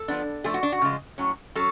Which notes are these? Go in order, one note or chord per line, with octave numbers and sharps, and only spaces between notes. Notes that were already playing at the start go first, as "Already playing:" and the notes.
Already playing: A4
F3 B3 D4
F3 A3 D4 G#4
F#4
D4
F#4
C#3 F3 G#3
A2 F#3 C#4
F#3 C#4 A4